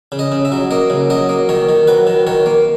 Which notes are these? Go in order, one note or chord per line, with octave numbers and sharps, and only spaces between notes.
C#3
D#5
C#3
E5
F#3
A#3 D#5
C#3
F#3 D#5
A#3
D#3 C#5
D#3
F#3 B4
D#3
D#3 C#5
A#3